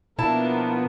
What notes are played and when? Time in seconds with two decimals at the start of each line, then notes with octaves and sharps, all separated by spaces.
0.19 B2 F3 A#3 B3 D4 E4 A5